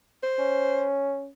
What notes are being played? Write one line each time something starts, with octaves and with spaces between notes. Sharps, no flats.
C5
C#4